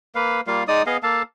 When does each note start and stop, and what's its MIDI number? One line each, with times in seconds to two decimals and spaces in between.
0.15 0.41 58
0.15 0.41 71
0.15 0.41 77
0.47 0.63 55
0.47 0.63 58
0.47 0.63 65
0.47 0.63 77
0.68 0.82 56
0.68 0.82 63
0.68 0.82 74
0.68 0.82 87
0.86 0.97 59
0.86 0.97 68
0.86 0.97 75
0.86 0.97 77
1.03 1.22 58
1.03 1.22 69
1.03 1.22 77
1.03 1.22 81